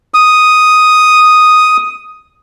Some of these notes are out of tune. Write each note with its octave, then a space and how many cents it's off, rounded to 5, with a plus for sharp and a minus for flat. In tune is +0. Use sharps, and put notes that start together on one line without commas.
D#6 +0